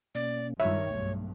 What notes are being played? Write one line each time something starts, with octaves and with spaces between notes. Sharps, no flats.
B2 A#3 C#4 D5
G2 D#3 G#3 F4 C#5 E5
B1 G2 A3